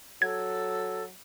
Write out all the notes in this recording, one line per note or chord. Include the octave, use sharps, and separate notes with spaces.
F#3 A4 G#6